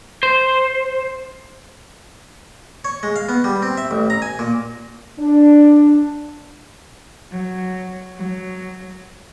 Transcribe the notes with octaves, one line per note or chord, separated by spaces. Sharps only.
C5
C#5
G#3
F5
B3
G3
C4
E5
A1
A#5
G#5
A#2
D4
F#3
F#3